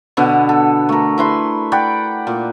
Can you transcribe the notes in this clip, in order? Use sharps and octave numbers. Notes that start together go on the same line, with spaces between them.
B2 D3 B3
A4
A3 A#4
E4 B4 C6
D5 F#5 G5 B5
A#2